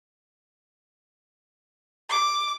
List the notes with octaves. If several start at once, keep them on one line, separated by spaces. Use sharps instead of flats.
D6